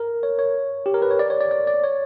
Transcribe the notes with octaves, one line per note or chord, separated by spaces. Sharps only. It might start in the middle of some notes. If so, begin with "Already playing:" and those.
Already playing: A#4
C#5
C#5
G4
A#4
B4
C#5
D5
C#5
D5
D5
D5
C#5